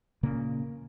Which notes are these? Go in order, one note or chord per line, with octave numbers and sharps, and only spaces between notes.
A#2 C#3 A#3